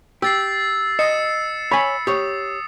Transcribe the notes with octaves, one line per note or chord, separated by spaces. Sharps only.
G4 E6 A6 C7
D#5 C#7 E7
C#5 G#5 B5
G4 C#5 D#6